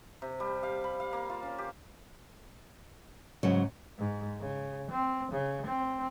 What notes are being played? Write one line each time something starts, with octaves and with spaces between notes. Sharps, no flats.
C3
G3
F5
B5
F5
A#3
F4
C#4
G4
G#2 C#3 F#3
G#2
C#3
C4
C#3
C4